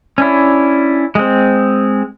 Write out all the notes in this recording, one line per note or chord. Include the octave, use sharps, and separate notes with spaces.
C#4 D4 E4
G#3 C4